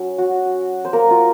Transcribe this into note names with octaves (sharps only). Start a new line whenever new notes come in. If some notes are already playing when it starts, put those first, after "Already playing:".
Already playing: F#3 C#4
F#4
C5
A#3 A#4
F4